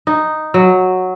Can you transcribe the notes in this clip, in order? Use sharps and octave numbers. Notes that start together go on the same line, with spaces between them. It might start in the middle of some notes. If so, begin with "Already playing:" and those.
D#4
F#3